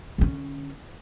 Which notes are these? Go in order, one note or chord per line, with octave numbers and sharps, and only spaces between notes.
D3 C#4